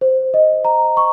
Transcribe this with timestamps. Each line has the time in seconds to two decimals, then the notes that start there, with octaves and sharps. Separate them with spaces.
0.01 C5
0.34 D#5
0.65 A#5
0.97 C#6